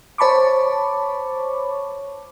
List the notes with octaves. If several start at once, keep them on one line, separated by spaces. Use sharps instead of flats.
C5 C#5 A5 B5 C#6 D6